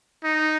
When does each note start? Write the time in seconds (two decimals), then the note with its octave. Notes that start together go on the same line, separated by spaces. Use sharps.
0.24 D#4